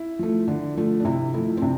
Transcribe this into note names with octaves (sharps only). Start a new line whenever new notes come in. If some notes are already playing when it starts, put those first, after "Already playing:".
Already playing: E4
F3 A3
D3
F3 A3
D4
C3 E4
F3 A3 E4
C4
C3 D4